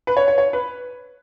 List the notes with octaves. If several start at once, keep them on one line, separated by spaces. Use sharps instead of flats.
B4
C#5
C#5
C#5
B4